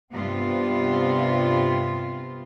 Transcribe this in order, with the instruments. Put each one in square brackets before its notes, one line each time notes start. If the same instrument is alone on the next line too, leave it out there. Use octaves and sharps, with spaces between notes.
[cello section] G2 C3 B3 C4 F4